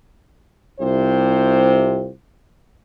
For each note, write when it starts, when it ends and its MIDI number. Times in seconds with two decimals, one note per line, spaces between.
0.80 2.09 36
0.80 2.09 48
0.80 2.09 65
0.80 2.09 72